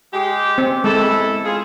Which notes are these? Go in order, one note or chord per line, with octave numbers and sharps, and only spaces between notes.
G#3 G4
C4
E2 G#3 E4 A4
F4 G#4